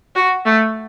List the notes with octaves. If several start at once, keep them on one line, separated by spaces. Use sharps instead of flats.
F#4
A3